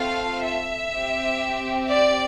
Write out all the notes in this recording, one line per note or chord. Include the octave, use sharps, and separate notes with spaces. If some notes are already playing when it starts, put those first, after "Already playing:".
Already playing: A3 C4 F4 A4 F5
E5
C4 G4
D5